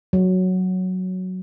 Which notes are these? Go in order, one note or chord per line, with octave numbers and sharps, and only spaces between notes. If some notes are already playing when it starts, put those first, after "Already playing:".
F#3